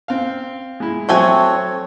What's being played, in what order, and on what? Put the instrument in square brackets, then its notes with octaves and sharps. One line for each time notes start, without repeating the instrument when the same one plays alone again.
[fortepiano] C4 F5
G#3 E4
[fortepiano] F#3 E5 [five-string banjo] A3 A4 G#5 [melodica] C4 C#5